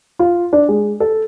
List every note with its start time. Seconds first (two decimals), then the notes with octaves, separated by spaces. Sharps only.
0.19 F4
0.53 D4
0.69 G#3
1.00 A4